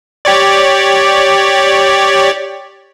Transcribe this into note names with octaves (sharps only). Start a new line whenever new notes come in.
G4 C#5 D5